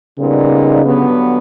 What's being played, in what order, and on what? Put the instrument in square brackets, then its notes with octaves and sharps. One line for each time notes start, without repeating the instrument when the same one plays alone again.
[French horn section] A#2 G3 B3 D#4 [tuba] C#3
[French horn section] G2 D3 F#3 B3